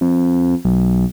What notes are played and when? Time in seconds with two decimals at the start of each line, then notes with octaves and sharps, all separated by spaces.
0.01 F2
0.65 B1